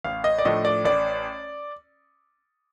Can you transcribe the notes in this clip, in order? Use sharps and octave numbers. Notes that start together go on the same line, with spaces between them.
A1 F5
D#5
D5
A2 F3 A3 D4 D#5
D5
A1 D5